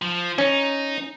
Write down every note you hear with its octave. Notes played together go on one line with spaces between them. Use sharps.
F3
C#4 D#4